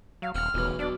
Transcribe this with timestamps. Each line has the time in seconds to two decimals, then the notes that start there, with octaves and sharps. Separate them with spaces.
0.22 F#3 F5
0.35 D#1 C4 F#5 F6
0.54 D#1 B1 E2 A2
0.79 B1 D4 D5